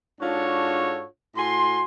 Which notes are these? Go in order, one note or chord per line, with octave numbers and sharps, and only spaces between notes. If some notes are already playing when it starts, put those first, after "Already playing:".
G#2 D4 F4 F#4 A4 C#5
A2 F#4 G#5 C6